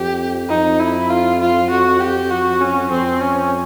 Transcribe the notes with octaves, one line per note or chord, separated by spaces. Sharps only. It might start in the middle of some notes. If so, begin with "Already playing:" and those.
Already playing: F2 G4
F2 D#4
E4
F4
F4
F#4
G4
F#4
C#4
F2 C4
C#4